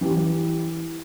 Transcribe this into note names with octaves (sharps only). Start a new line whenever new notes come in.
E3 G4